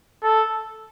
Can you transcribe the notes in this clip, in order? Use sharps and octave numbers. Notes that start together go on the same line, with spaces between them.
A4